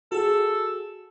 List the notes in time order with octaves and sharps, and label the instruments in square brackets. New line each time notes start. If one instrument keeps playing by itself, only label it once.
[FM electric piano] F#4 G#4 [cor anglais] A4